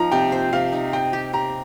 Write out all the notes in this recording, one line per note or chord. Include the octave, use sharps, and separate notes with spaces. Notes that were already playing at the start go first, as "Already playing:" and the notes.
Already playing: F3 D#4 A#5
C3 G5
C5
C3 F5
D#4
D#5 G5
G4
G4 A#5